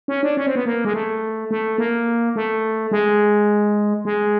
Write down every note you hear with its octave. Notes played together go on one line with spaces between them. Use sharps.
C#4
D4
C#4
C4
B3
A#3
G#3
A3
A3
A#3
A3
G#3
G#3